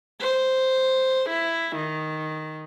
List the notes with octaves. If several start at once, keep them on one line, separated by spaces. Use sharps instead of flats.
C5
E4
D#3